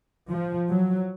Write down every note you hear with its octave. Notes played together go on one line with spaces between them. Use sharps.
F3
F#3